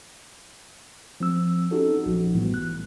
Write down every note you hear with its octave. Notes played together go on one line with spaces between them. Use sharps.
F3 C4 E6
C#4 D#4 F#4 G4 A4
A#1 F3 F#4
A2 E3 G3 B3
F#6